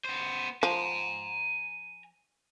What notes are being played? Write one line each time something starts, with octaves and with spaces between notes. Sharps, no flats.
B3 C5
F3 G#5 A#5